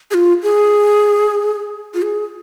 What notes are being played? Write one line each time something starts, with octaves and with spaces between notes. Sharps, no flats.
G#4
F4
G#4
F4
G#4